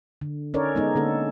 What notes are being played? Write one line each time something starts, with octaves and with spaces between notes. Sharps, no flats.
D3
C#4 D#4 A4 A#4 C#5 D5
G#3 B3 D#4
D3 A#3 C#4 A4